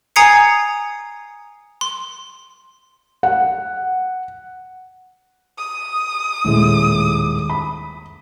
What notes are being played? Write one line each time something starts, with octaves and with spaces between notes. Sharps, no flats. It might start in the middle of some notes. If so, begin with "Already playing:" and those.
G#5 A#5 D#6 G#6 C7 C#7
C6
F#5
D#6
D#1 A2 G#3
B5